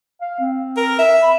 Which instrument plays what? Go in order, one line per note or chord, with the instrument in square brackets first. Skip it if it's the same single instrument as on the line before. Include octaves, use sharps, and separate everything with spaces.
[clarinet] F5
C4
[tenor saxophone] A#4
E5
[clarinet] B5